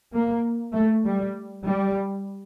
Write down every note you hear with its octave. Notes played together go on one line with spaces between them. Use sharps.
A#3
A3
G3
G3